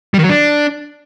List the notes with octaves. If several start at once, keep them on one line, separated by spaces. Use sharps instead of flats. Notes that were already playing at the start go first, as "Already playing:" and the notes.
G3
D#3
F#3
D4